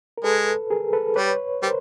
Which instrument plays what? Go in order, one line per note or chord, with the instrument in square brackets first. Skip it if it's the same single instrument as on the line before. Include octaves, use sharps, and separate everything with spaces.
[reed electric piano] A#4
[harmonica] G#3 [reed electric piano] A4 B4
[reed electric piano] G#4 A#4
A4 B4
[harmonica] G3 [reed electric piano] B4 C#5
[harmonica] G3 [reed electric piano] A#4 C5